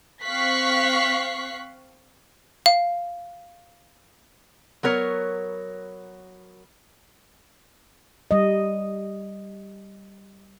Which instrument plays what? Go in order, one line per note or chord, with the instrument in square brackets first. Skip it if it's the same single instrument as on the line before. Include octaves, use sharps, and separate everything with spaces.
[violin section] C4 F5 C#6 F#6 B6 C7
[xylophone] F5
[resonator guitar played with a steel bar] F#3 B3 A#4 C#5
[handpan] G3 D#5